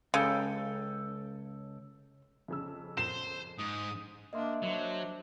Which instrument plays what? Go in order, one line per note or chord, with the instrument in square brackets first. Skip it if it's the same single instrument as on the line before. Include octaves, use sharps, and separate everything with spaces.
[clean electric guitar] C#2 A4 G5 [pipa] C#3
[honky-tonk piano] F2 C#3 E6
[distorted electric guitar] C5 [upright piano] E7
[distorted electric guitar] G#2 [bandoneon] D#6
[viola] A#3 D4 [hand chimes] D#5 E5 C6
[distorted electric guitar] F#3 [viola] D4 C5